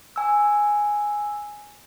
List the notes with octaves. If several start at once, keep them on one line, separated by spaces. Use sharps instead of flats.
G#5 E6